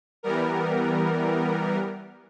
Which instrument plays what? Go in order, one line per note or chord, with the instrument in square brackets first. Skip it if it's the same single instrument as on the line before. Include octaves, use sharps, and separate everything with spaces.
[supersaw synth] E3 G3 B3 A#4